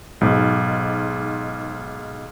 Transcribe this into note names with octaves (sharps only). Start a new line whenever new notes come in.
B1 G#2